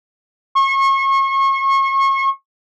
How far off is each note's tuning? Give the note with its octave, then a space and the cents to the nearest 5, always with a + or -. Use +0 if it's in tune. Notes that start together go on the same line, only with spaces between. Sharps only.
C#6 -35